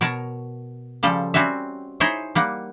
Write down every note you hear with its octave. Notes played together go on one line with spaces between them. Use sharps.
B2 A#4 C#5 A5
C#3 F3 G3 A4
G3 C4 C#4 F#4 E5
D#4 E4 G#4 C5 C#5 D#5
G3 A#3 F#5